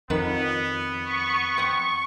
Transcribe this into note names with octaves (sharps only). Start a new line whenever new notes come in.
F2 D#3 B3 B4
C#6
C4 F#5